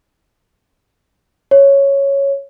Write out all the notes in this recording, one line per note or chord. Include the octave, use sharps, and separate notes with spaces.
C#5